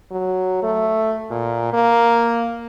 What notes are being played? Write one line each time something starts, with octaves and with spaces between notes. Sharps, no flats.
F#3
A3
A#2
A#3